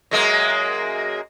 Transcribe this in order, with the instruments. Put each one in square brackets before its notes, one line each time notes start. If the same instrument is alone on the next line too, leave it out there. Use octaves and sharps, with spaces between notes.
[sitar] F#2 G#3 A#3